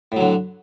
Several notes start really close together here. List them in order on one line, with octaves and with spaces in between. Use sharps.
A2 F#3 D3